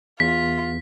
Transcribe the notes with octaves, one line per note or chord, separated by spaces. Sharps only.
E2 F4 B6